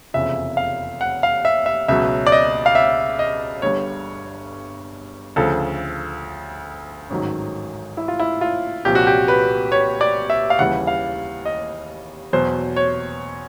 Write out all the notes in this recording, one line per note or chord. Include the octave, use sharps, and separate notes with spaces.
F1 E2 C#3 F3 E5
F5
F#5
F5
E5
E5
C#2 B2 F#3 E5
D5
D#5
F5
E5
D#5
G1 G2 D3 G3 C#5
D2 C#3 F3 A4
A1 G#2 D#3 F#3
E4
F4
E4
F4
C2 A#2 F3 G4
F#4
G4
B4
C#5
D5
E5
F5
D#2 C#3 E3 G3 F#5
F5
D#5
E2 B2 F#3 C5
C#5